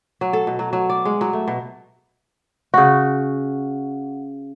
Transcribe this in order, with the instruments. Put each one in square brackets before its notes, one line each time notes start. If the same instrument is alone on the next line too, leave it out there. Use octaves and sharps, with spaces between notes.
[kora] F#3
A4
B2
F#3
F#3
D5
G#3
F#3
A3
B2
C#3 F#4